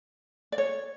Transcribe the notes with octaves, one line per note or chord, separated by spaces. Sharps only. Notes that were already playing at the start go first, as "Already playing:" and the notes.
D5
C#5